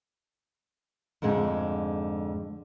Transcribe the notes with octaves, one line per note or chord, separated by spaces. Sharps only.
F2 G#2 D3 G#3